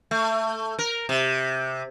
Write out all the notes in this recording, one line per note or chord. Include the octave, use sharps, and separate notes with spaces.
A3
A#4
C3